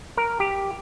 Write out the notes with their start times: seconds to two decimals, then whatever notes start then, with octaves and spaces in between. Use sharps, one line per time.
0.17 A#4
0.40 G4